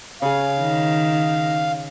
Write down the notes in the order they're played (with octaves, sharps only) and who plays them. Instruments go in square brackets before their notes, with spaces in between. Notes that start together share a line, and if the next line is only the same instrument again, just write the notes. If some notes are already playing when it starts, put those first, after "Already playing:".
[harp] C#3 G#4 [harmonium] F5
[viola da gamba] D#3